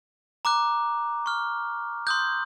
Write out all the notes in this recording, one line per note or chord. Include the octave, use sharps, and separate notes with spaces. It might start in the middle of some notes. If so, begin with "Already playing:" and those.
A#5 D6 F#6
C#6 F6
C6 D#6 F#6 G6